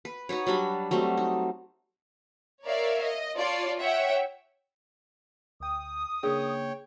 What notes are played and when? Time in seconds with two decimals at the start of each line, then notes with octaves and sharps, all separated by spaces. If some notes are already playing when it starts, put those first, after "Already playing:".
0.05 B4
0.29 D#4 F#4 B4 C#5
0.47 F#3 G3 D4 B5
0.91 F#3 G3 A3 C4
1.17 D#4
2.66 A#4 C#5 D5 E5 F5
3.04 D#5
3.38 F4 C#5 D5 A5 C6
3.79 C#5 E5 F#5 G5
5.60 D2 G5 D#6
6.23 C#3 A#3 D4 G#4 C#5 G5